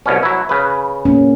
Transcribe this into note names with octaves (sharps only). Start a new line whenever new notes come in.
C2 B2 C#4
F#3 E4
C#3 B4
A#3 C#4